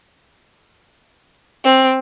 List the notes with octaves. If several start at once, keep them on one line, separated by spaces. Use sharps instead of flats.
C4